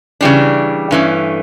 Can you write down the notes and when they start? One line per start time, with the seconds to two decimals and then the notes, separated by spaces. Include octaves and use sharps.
0.21 C#3 E3 G3 D4
0.91 G2 E3 A3 C#4